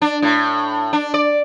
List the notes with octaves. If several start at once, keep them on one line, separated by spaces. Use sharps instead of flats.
D4
A2
D4
D5